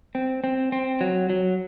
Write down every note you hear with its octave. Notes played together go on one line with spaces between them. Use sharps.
C4
C4
C4
F#3
F#3